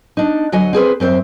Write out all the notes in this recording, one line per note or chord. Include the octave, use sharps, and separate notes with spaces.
D4 D#4
D2 F#3 D#5 F#5 G#5
C4 G#4 B4 C5
F#2 C4 D#4 C5 E5